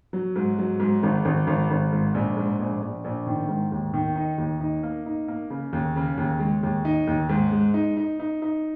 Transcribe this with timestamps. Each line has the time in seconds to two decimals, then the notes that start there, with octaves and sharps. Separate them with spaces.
0.13 F#3
0.36 G#2
0.59 F#3
0.80 G#2
1.03 G#1
1.25 G#1
1.47 G#1
1.70 G#1
1.92 G#2
2.14 A#1
2.37 G#2
2.59 A#1
2.82 A#1
3.04 A#1
3.26 D#3
3.48 G#2
3.72 D#2
3.94 D#3
4.16 D#4
4.38 D#2
4.60 D#4
4.83 A#3
5.06 D#4
5.28 A#3
5.50 C#3
5.73 D#2
5.96 C#3
6.17 D#2
6.39 G#3
6.63 D#2
6.85 D#4
7.07 D#2
7.29 G#2
7.52 G#3
7.74 D#4
7.97 D#4
8.20 D#4
8.42 D#4